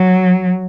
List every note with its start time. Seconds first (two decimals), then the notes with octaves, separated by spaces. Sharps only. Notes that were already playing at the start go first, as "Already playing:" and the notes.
Already playing: F#3